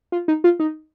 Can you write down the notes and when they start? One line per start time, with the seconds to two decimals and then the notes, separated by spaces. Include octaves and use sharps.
0.12 F4
0.28 D#4
0.44 F4
0.60 D#4